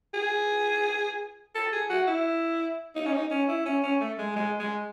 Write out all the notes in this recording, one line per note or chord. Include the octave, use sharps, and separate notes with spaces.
G#4
A4
G#4
F#4
E4
D#4
C#4
D#4
C#4
E4
C#4
C#4
A3
G#3
G#3
G#3